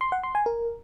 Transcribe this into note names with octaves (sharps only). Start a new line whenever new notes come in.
C6
F#5
C6
G#5
A#4